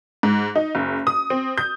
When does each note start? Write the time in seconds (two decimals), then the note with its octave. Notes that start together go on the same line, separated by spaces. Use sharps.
0.23 G#2
0.56 D#4
0.75 F#1
1.07 D#6
1.30 C4
1.58 G6